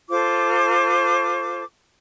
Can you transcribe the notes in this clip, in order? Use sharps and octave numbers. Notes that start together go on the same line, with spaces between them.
F4 A4 C5 D6